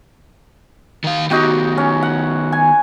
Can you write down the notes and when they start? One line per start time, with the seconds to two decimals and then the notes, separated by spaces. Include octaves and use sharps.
1.04 D#3 F5
1.30 D#3 B3 D#4 F#4 G4
1.78 C#4
2.03 F#5
2.52 G#5